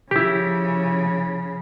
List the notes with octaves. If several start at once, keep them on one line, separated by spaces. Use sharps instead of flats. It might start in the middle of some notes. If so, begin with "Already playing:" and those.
C#3 F3 E4 G4